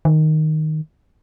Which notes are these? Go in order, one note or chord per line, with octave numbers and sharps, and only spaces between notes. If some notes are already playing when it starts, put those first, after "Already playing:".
D#3